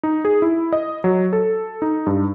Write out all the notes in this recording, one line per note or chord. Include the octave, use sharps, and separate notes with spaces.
D#4
G#4
E4
D#5
F#3
A4
D#4
G2